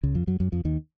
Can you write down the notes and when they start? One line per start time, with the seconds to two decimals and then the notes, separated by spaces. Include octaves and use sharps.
0.03 C#2 C#3
0.15 F2 F3
0.27 F#2 F#3
0.40 F#2 F#3
0.52 F2 F3
0.65 D#2 D#3